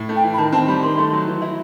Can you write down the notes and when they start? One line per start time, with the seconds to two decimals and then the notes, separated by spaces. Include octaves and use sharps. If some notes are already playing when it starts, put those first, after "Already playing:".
Already playing: A2
0.09 A3
0.16 G5
0.24 E3
0.33 B5
0.38 D#3 A5
0.52 C4 A5
0.68 G3 B5
0.83 D#3 C6
0.98 A3
1.13 F#3
1.28 E3
1.42 E4